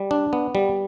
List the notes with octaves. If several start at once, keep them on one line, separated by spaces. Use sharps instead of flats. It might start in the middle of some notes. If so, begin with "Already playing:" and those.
Already playing: G3
D4
B3
G3